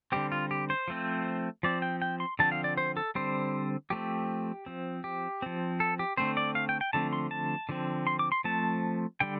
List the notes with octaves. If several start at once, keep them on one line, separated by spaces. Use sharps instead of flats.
D3 G3 C4 G4
F4
G4
C5
F3 A3 C4
F3 C4 D5
G5
G5
C6
D3 F3 C4 A5
F5
D5
C5
A4
D3 G3 C4 C5
F3 A3 C4 G4
F3 C4
G4
F3 C4
A4
G4
D3 A3 C4 C5
D5
F5
G5
G5
D3 F3 A3 C4 A5
C6
A5
D3 F3 C4
C6
D6
C6
F3 A3 C4 A5
D3 G3 G5